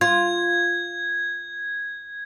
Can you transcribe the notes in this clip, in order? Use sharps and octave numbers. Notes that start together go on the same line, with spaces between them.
F4 G#6